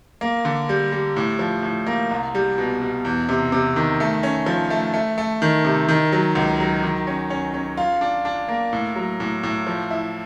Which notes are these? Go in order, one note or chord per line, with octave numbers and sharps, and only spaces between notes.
A#3
D3
G3
G3
A2
F3
A2
A#3
C2
G3
B2
B2
E2
C3
C3
D#3
A3
C#4
F3
A3
A3
A3
D#3
C3
D#3
F#3
C#2
F#3
D#3
C#4
C#4
C#4
F4
D4
D4
A#3
A2
F#3
A2
A2
F3
E4